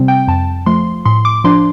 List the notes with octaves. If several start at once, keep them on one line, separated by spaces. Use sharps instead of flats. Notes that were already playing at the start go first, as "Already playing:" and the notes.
Already playing: C3 G3 C4
G5
F2 A5
F3 A3 C6
A2 C6
D6
F3 D4 C6